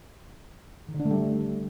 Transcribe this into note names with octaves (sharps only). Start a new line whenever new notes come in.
D#3
D3
D4
A3
G3